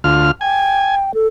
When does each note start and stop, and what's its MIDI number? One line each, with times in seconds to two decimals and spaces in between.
0.04 0.31 38
0.04 0.31 65
0.04 0.31 89
0.41 1.14 79
0.41 0.95 80
1.14 1.27 69